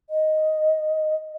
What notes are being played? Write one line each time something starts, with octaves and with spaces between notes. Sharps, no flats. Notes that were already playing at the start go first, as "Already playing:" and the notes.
D#5